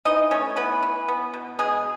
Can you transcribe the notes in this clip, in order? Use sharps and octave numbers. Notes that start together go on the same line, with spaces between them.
E3 D#4 D#5
A3 C#4 C#5
E3 B3 B4
E3
B3
B2
B2 G#3 G#4